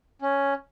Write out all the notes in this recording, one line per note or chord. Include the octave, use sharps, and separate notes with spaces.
C#4